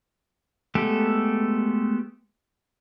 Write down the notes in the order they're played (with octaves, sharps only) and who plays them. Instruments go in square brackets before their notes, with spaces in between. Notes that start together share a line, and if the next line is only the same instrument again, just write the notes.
[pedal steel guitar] G#3 A3 B3 G4 A4